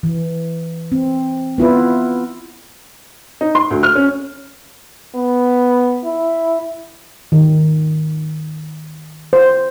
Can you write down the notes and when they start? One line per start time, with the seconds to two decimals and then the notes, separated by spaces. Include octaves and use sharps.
0.03 E3
0.92 C4
1.58 B3 E4 F4 B4
3.41 D#4
3.55 C6
3.70 D2
3.83 F6
3.95 C#4
5.16 B3
6.05 E4
7.32 D#3
9.33 C5